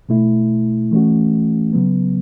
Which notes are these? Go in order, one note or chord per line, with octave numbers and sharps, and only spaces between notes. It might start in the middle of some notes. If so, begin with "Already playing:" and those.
B2 A3 E4
E3 A3 C#4 F#4
C#3 F#3 B3